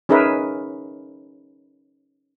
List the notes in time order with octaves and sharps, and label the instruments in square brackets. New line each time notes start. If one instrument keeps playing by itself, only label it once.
[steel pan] C#4 D#4 G#4 A#4 B4 E5